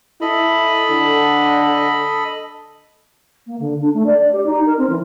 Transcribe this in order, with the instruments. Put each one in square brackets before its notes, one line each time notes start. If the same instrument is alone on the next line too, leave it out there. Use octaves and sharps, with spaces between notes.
[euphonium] E4 [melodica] A4 D#5 B5
[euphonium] D3
[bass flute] A#3
D3
D4
A3
D5
D5
G4
D#4
A#4
C4
E3